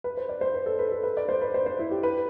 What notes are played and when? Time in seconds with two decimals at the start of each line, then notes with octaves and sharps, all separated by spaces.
0.04 B4
0.17 C5
0.29 D5
0.41 C5
0.54 B4
0.66 A4
0.79 B4
0.92 A4
1.03 B4
1.17 D5
1.29 C5
1.41 B4
1.54 C5
1.66 C5
1.79 E4
1.91 G4
2.03 B4